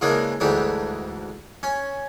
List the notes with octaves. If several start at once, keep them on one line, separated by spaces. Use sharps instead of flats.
C#3 E3 G#3 A#3 D4
D2 G#2 E3 G3 D4
C#4